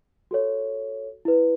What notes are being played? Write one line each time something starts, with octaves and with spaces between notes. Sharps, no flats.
F#4 A4 C#5
E4 B4